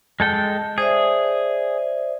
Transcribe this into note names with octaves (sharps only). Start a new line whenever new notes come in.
G#3 A4 G5
G#4 C5 D5 E5